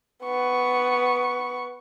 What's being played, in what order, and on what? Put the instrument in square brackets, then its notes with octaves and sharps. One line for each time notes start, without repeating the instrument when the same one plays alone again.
[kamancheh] B3 C#6